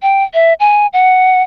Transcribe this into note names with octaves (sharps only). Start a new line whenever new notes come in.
G5
E5
G#5
F#5